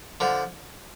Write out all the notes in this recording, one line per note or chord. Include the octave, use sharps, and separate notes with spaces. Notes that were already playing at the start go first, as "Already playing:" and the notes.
D3 F3